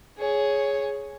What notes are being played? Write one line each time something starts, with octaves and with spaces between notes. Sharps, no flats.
G#4 C#5